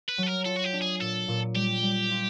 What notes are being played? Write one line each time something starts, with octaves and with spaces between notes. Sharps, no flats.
B4
F#3 A4
A#4
F4 A4
F#4
G4
D4
G#4
A#2 A4
A#2
G3 G4
G3
F4